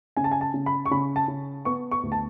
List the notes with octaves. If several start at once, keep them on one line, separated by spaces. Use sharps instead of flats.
C#3 G#5
A5
G#5
A5
C#3
B5
C#6
C#3 B5
A5
C#3
B3 C#6
C#6
D2
A5